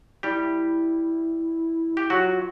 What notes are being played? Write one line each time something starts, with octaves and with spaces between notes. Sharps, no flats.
G3 E4 G4
G4
F#3 F4 F#4